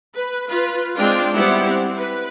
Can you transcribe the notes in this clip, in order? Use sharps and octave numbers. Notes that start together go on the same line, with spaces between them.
B4
F4 B4
G#3 C4 D4 F4 G5
G3 B3 E4 G4 C5 F#5
C4
B4